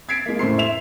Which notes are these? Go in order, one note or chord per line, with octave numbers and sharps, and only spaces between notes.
G#6 A6 B6 C7 D7
G#3 A#3
A2 C#3 A3 C5 C6 C7
E5 F7